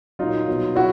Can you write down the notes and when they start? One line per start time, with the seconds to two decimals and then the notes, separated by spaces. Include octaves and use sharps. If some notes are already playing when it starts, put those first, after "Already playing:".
0.19 A#2 F#3 D#4 F4
0.48 B2 F#3
0.75 F#3 E4 F#4